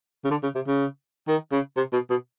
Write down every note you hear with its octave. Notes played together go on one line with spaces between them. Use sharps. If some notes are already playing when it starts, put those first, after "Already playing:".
C#3
D3
C#3
C3
C#3
D#3
C#3
C3
B2
B2